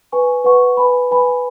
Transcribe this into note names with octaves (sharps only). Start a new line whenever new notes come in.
B4 G#5 C#6
B4 F#5 C#6
B4 G#5 B5
B4 G#5 B5